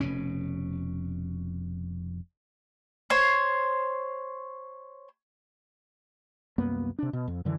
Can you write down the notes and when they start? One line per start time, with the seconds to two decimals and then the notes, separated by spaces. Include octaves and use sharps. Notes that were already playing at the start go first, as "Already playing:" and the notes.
0.01 F1 B2 C#4
3.10 C5 C#5
6.58 C2 F#2 A#3 B3
6.99 C3 D4
7.13 B2
7.28 F2
7.45 F#2 D3 E3